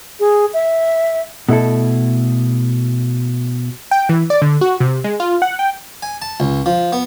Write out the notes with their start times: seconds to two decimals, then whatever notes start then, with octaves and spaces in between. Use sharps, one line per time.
0.20 G#4
0.54 E5
1.49 B2 A3 E4 A4
3.91 G5
4.09 E3
4.30 D5
4.42 D3
4.61 F#4
4.80 C3
5.04 G#3
5.20 F4
5.42 F#5
5.59 G5
6.03 G#5
6.22 A5
6.40 C#2
6.66 F3
6.93 B3